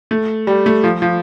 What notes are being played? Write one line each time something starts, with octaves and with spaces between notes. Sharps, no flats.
A3
G3
A3
F3
F3